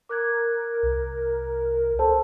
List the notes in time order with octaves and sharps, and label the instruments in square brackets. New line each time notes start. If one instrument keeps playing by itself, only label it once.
[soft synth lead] A#4 [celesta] D6 F#6 G#6
[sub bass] C2
[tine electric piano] A4 C5 [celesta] A5